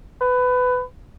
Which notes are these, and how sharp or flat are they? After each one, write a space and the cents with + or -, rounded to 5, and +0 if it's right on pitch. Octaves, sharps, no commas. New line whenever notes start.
B4 +20